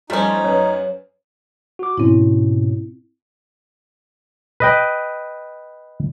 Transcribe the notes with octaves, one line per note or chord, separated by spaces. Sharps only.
F3 G3 A3 C#4 D#4 C5
F#2 B4 C#5
F#4 D6
G#2 B2 C4 C#4 E4
B4 D#5 G5